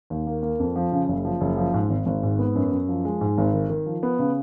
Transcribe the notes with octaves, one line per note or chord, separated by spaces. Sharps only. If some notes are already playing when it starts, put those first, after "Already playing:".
D#2
A#3
A#3
F2
F3
C#3
F#1
F3
F#1
F3
G#2
G#1
G#1
G#2
B3
F#2
F#2
F3
G#3
G#2
G#1
D#3
D#3
F3
B3
C#3